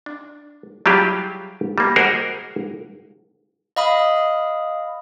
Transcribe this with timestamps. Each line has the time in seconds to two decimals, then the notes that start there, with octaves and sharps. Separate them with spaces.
0.06 D4
0.86 F#3 G3 E4 F4 G4 G#4
1.78 G3 A#3
1.96 F#4 G#4 A#4 C5 D#5
3.76 D#5 F5 B5 D#6